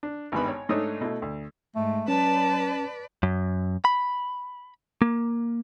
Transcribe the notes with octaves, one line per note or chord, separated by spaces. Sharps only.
D4
G#1 G2 G3 B3 B5
C#5
G#2 A3 D4 D#4 C#5 D#6
B2 A3 E4
D2
G#2 A3
F#3 C#4 B4 D5 A5
F#2
B5
A#3